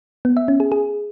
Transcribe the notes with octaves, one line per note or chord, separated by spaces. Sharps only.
B3
E5
C#4
G#4
G#4